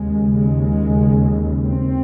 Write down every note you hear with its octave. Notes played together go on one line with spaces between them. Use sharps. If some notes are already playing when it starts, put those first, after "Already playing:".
Already playing: D#2 C#3 G#3
G#3
C4